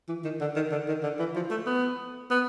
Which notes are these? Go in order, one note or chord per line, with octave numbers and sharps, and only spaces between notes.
E3
D#3
D3
D#3
D3
D#3
D3
E3
F3
A3
B3
B3